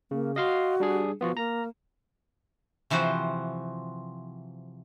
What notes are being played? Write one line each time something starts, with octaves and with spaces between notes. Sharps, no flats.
C#3 A#3
F#4 D#5 F5 C6
G3 D4 G#4
F3 B3 F4 F#4
A#3 A#5
C3 E3 F3 F#4 C5